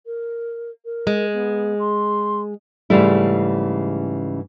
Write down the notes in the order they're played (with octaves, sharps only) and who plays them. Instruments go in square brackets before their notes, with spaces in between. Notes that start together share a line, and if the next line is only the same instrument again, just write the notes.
[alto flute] A#4
A#4
[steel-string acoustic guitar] G#3
[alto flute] B3
C6
[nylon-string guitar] G#2 C#3 E3 G3 A3 E4